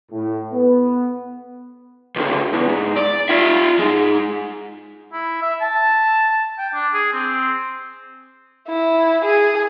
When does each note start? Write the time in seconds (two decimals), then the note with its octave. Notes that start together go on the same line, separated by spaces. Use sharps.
0.11 A2
0.52 B3
2.16 C#2 D3
2.53 E2
2.69 G#2
2.96 D5
3.29 F4 E5
3.79 G#2 G#3
5.13 E4
5.42 E5
5.61 A5
6.58 G5
6.74 D4
6.93 G#4
7.13 C4
8.68 E4
9.24 G#4